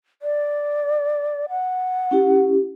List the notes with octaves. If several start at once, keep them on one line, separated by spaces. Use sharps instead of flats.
D5
F#5
C#4 E4 G4